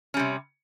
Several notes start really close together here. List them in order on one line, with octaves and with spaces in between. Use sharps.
C#4 G3 C3